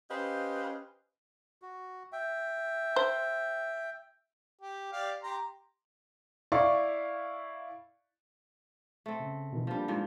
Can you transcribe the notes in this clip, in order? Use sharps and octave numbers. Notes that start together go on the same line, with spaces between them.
C#4 G4 B4 C5 D#5 F5
F#4
E5 G5
C5
G4
G4 D5 F5
G4 A#5 C6
E4 D5 F5 C#6
A3 C4
C#3
B2 D#3 E3
F3 G3 A#3 B3 D4
G#2 F3